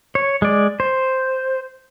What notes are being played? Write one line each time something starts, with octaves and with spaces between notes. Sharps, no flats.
C#5
G#3 D5
C5